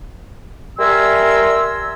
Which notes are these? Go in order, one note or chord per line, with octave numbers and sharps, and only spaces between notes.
G3 A#4 E5 G#5 C6 E6